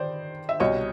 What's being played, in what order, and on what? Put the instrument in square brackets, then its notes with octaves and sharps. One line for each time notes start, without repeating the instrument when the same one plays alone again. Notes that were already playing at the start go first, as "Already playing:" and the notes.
Already playing: [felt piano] D#3 C5 D5
E5
C2 B2 C#5 D#5